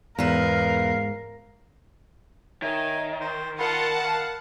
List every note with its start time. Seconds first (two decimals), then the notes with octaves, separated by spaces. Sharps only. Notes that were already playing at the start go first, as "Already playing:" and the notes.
0.19 E2 G#2 A#4 B4 F5
2.62 D#3 C#5 E5 G#5
3.21 C5
3.59 F4 A#4 F#5 A5 B5
4.04 F5